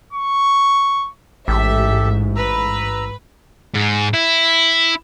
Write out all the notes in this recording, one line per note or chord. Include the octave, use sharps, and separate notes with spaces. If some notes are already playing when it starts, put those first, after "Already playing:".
C#6
A1 G#2 G4 A4 E5
B4 A#5 E6
G#2
E4